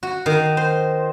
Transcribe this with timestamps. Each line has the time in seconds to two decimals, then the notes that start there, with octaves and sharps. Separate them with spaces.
0.03 F#4
0.26 D#3
0.57 C5